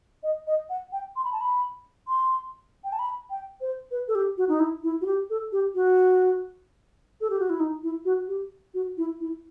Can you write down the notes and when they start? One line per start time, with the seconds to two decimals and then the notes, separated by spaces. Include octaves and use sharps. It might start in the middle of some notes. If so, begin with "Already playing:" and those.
0.23 D#5
0.47 D#5
0.70 F#5
0.92 G5
1.16 C6
1.24 B5
1.32 A5
1.41 B5
2.08 C6
2.84 G5
2.92 A5
2.99 B5
3.30 G5
3.61 C5
3.91 B4
4.08 A4
4.15 G4
4.37 F#4
4.49 D#4
4.60 E4
4.83 E4
5.01 F#4
5.06 G4
5.30 A4
5.52 G4
5.75 F#4
7.21 A4
7.30 G4
7.40 F#4
7.50 E4
7.60 D#4
7.83 E4
8.05 F#4
8.28 G4
8.74 F#4
8.98 E4
9.20 E4